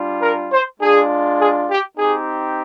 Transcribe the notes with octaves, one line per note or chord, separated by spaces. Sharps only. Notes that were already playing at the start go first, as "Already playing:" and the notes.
Already playing: G3 D4 F4
A#4
C5
G#3 D4 F4 G#4
G#4
G4
C4 D#4 G4 G#4